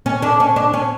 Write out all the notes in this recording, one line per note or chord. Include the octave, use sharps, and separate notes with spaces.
C#4
D4
C#4
D4
C#4